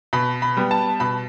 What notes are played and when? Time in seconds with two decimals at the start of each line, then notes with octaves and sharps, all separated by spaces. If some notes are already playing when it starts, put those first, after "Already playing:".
0.13 B2 B5
0.42 B5
0.57 G3 B3
0.71 A5
1.00 B2 B5